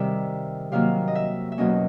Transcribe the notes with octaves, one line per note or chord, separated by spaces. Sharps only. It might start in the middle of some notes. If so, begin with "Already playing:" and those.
Already playing: C3 D#3 G3 E5
C3 D#3 F#3 A#3 F5
D#5
E5
E5
E2 B2 F#3 A#3 C#4 D#5